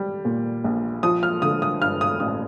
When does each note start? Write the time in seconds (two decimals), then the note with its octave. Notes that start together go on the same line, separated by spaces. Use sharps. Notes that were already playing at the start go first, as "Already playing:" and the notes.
Already playing: G3
0.25 A#2
0.64 A#1
1.03 F3 D#6
1.23 F6
1.42 D3 D#6
1.62 D#6
1.81 G2 F6
2.01 D#6
2.20 A1 D#6